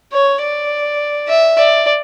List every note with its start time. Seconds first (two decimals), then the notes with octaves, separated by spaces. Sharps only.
0.12 C#5
0.42 D5
1.28 E5
1.58 D5